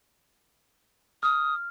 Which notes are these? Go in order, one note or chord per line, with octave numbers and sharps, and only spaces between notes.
D#6 F6